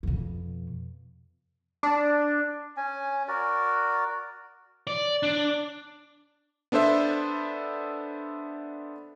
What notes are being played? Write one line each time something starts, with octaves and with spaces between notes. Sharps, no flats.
F2 B2
D4
C#4 G#5
F#4 A#4 D5
D5
D4
B3 D4 A4 C5 E5